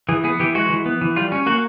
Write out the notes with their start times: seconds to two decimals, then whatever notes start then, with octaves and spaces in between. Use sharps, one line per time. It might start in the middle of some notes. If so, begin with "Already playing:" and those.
0.09 E3 G#4
0.24 B3 G#4
0.40 E3 G4
0.55 G#3 F#4
0.70 E3
0.86 B3
1.01 E3
1.16 G3 F4
1.32 C#4
1.46 A#3 F#4